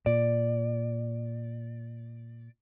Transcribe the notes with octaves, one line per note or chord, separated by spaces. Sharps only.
A#2 D5